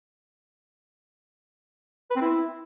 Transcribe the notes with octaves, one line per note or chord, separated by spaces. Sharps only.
B4
C4
E4